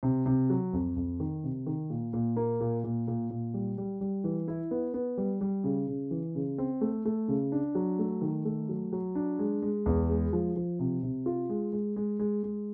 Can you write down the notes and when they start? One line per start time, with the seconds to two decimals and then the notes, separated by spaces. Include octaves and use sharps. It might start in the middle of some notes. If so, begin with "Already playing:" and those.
0.03 C3
0.26 C3
0.50 F#3
0.73 F2
0.96 F2
1.20 D#3
1.44 C3
1.66 D#3
1.90 A#2
2.13 A#2
2.36 A#3
2.61 A#2
2.84 A#2
3.08 A#2
3.30 A#2
3.54 G3
3.78 G3
4.01 G3
4.24 E3
4.48 E4
4.71 B3
4.94 B3
5.18 G3
5.41 G3
5.64 C#3
5.88 C#3
6.11 E3
6.35 C#3
6.58 C4
6.81 A3
7.05 A3
7.28 C#3
7.52 D4
7.75 F#3
7.99 A3
8.21 D#3
8.45 A3
8.69 F#3
8.92 F#3
9.15 D4
9.39 G#3
9.62 G#3
9.86 E2
10.09 G#3
10.33 F3
10.56 F3
10.79 C3
11.03 C3
11.26 F4
11.49 G#3
11.73 G#3
11.96 G#3
12.19 G#3
12.43 G#3